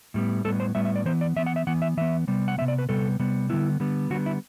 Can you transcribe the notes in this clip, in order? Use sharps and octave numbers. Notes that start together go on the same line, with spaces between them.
A2 G3 B3
A2 G3 B3 A4
C5
A2 G3 B3 E5
E5
D5
E3 B3 C5
D5
E3 B3 E5
F#5
E5
E3 B3 F#5
E5
E3 B3 E5
C3 G3 B3
F#5
C3 G3 B3 E5
D5
B4
C3 G3 B3 A4
C3 G3 B3
D3 G3 B3 E4
D3 G3 B3
D3 G3 B3 F#4
E4